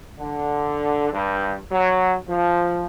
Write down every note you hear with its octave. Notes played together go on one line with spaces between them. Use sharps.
D3
G2
F#3
F3